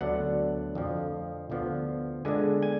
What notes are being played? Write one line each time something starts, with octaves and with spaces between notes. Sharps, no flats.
D2 D3 F#3 B3 D4 F#5
F2 D3 F3
D2 D3 F3 B3
D3 G#3 B3 D4 G#5
G#5